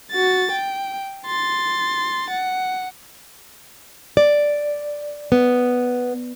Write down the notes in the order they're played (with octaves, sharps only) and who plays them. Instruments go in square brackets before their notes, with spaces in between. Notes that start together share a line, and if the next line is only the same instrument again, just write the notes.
[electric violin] F#4 A6
G5
C6 A6
F#5
[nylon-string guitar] D5
B3